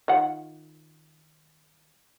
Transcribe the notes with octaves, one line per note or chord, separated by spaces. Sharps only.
D#3 F4 F#5